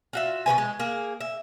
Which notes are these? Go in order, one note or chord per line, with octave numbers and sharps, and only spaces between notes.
F4 F#4 E5
B2 G3 B4 G#5
G#3
A#3 G#4
E5